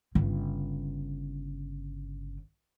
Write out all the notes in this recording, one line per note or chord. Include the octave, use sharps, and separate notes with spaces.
G1 C#3